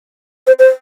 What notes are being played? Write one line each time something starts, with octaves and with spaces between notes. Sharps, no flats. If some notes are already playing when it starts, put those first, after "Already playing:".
C5
C5